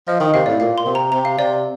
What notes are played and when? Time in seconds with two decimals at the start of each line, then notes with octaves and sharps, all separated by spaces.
0.08 F3 D#5
0.20 D#3 G5
0.34 C3 F5
0.46 A2 D5
0.60 A#2 F5
0.78 C6
0.86 C3
0.95 A#5
1.12 C3 A#5
1.25 F5
1.38 C3 D5